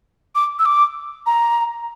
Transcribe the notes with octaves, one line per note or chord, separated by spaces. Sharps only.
D6
E6
D6
A#5